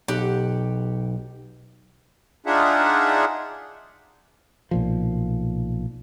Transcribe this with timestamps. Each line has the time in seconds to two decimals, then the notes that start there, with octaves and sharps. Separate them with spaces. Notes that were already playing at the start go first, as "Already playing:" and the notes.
0.08 B1 G4 F#5
2.46 D4 D#4 F4 G#4 E5 F#5
4.71 B1 A#2 F3